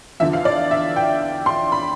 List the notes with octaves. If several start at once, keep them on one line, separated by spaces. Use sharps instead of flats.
E2 D3 F3 E5
F5
D5
E5
G5
C6
B5